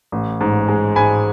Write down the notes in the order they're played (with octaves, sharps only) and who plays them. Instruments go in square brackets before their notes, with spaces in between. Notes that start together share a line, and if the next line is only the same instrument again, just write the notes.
[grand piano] A1
G#2
G#3
G#2 G#5 B5